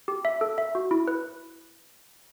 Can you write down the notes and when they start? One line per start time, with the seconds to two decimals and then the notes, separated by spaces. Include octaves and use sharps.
0.08 G4
0.25 E5
0.41 A4
0.58 E5
0.75 F#4
0.91 E4
1.08 B4